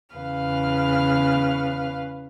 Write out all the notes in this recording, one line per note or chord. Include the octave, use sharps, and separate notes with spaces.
E2 C#3 B4 F5 F6